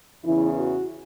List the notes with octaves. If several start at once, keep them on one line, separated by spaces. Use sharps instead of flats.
E2 C#3 E3 E4
F#4